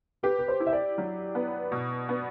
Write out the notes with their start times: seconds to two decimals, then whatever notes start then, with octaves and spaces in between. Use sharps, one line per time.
0.23 G4 B4
0.39 B4
0.48 C5
0.60 E4
0.67 E5
0.72 D5
0.98 F#3
1.35 B3
1.72 B2
2.09 B3